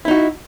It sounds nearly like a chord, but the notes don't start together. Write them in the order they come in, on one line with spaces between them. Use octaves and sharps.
E4 D#4 F#4